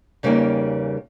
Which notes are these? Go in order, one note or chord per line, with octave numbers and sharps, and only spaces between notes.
E2 C#3 G3 A#3 C#4 D#4